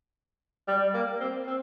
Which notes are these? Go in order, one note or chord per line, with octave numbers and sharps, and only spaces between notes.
G3
A#3
C4
C4